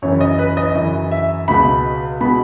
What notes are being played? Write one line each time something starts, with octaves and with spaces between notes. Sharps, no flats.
F#2 C#3 E3 C#5
D#5
B4
D#5
F#2 C#3 E3 D#5
E5
C#2 B2 G#3 B3 B5
B2 G#3 B3 B5